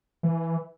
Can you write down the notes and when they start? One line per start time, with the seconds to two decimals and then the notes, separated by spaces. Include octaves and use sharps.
0.23 E3